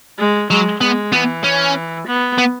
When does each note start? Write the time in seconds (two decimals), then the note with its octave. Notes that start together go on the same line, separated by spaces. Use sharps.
0.18 G#3
0.50 F#3 G#3
0.81 G#3 B3
1.12 E3 B3
1.44 C#4
2.07 B3
2.38 B3